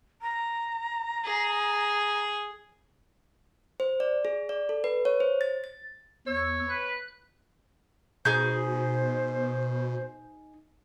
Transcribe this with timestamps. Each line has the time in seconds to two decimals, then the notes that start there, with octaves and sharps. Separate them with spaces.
0.22 A#5
1.25 G#4
3.80 C5
4.00 D5
4.25 G#4
4.49 D5
4.69 A4
4.84 B4
5.05 C#5
5.20 C5
5.41 A6
5.64 A6
6.27 E2 C#5 E6
6.69 B4 F#6
8.25 B2 D#4 G#4 C5 G6